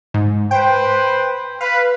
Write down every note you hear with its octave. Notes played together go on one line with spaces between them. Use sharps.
G#2
B4 C5 G5
B4 F5